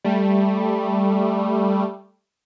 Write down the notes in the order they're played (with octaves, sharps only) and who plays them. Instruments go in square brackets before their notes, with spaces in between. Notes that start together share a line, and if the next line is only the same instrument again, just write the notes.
[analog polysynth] G3 A3